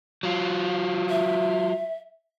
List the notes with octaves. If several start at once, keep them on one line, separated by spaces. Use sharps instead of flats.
F#3 F4
E5